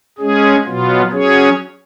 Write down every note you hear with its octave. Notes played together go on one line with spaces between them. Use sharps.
G#3 C#4 G#4
B2 F#3 B3 F4
F#3 C#4 G#4 C#5